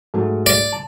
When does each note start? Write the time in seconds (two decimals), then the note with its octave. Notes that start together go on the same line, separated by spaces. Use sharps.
0.14 G#2 F#3 A3
0.46 D5
0.72 A5